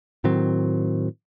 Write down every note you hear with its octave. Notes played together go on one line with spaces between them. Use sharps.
A2 D#3 F#3 C4